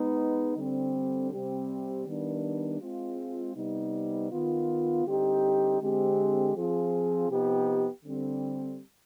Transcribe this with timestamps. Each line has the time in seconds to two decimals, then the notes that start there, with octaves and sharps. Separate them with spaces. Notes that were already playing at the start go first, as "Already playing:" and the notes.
Already playing: G#3 B3 D#4 B4
0.56 D3 G3 C4
1.31 C3 G3 C4 G4
2.06 D#3 G3 B3 D4
2.81 G#3 C4 F4
3.55 C3 G3 B3 D#4
4.30 D#3 B3 F4
5.05 D3 G3 C4 D#4 G4
5.80 D3 G#3 C4 G4
6.55 F3 C4 F4 G#4
7.30 C3 F3 B3 D#4 G4
8.04 D3 G3 C4